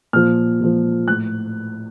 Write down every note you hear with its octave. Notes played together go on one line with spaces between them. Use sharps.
A#2 F3 F6
A#2 F3
A2 F#6